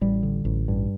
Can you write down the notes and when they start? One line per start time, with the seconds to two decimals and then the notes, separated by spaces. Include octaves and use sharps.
0.01 A1 G3
0.23 D3
0.45 A1
0.68 G2